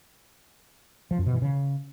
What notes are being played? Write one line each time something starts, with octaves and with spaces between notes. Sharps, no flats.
F3
F#2
B2
E3
C#3